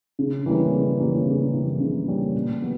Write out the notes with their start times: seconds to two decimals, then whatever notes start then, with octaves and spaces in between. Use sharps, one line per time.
0.19 C#3
0.46 E3 G3 A#3 C#4
0.72 C#3
0.99 E3 G3 A#3 C#4
1.26 C#3
1.54 E3 G3 A#3 C#4
1.80 C#3
2.08 E3 G3 A#3 C#4
2.35 A#2
2.62 F#3 B3